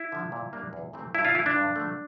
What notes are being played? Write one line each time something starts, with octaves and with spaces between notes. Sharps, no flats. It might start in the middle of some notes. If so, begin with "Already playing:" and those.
Already playing: E4
D3 F3
A#2
G3 A#3 D4
E2
C3 E3 A3 C4
G2 E4
F4
E3 A3 E4
D4
G2
D3 F3 A3